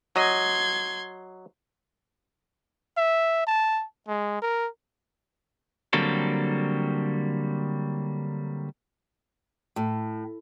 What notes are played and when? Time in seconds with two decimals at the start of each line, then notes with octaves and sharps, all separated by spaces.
0.16 F#3 D#5 C6 G#6
2.97 E5
3.47 A5
4.08 G#3
4.42 A#4
5.93 D3 F#3 G3 A#3 C4 A4
9.76 A2